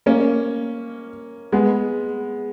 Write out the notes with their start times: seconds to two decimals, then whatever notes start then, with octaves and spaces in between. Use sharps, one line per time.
0.06 A#3 C#4
1.52 G#3 B3